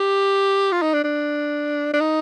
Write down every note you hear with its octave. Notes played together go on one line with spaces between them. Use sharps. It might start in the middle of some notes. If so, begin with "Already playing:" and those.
Already playing: G4
F4
D#4
D4
D4
D4
D#4